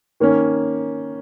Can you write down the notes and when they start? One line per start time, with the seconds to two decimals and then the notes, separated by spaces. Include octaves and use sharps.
0.20 D#3 A#3 C#4